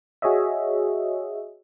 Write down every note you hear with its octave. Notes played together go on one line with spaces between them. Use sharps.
F#4 G#4 C#5 D#5 E5